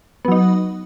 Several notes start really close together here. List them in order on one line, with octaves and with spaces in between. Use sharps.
B3 F#3 D#4